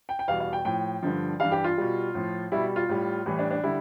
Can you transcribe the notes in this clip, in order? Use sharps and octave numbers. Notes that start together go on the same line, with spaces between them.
G5
G5
E2 B2 G3 F5
F5
G5
A2 F3 G5
G2 D3 F3
G2 E3 G3 F5
G4
F4
B2 G3
A2 F3
B2 G3 E4
F4
A2 G3
A2 E3 G3
D4
D4
D3 G3 E4